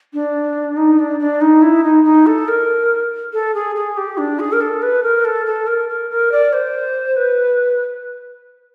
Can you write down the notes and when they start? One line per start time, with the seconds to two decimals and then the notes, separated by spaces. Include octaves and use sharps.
0.13 D4
0.77 D#4
0.99 D4
1.20 D4
1.41 D#4
1.62 E4
1.84 D#4
2.04 D#4
2.26 A4
2.48 A#4
3.33 A4
3.54 G#4
3.76 G#4
3.97 G4
4.18 D4
4.39 G#4
4.52 A#4
4.61 A4
4.82 B4
5.03 A#4
5.25 A4
5.46 A4
5.67 A#4
5.89 A#4
6.10 A#4
6.32 D5
6.53 C5
7.17 B4